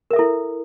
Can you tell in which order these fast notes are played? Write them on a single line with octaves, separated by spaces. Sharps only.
A#4 E5 A4 E4